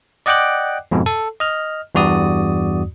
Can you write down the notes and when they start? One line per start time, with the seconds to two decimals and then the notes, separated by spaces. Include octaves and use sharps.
0.26 D5 D#5 F#5 G5 D6 F#6
0.91 F2 G#2 B2
1.06 A4
1.40 D#5 F6
1.95 E2 G2 F#4 D5 D#6